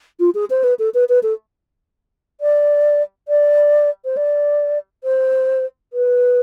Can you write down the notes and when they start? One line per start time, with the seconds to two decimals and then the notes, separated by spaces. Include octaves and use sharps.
0.20 F4
0.35 G#4
0.50 C5
0.64 B4
0.79 A4
0.94 B4
1.09 B4
1.23 A4
2.41 D5
3.28 D5
4.05 C5
4.17 D5
5.04 C5
5.93 B4